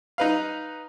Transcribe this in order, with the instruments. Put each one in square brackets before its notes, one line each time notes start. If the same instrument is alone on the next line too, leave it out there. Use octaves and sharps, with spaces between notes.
[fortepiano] D#4 B4 F5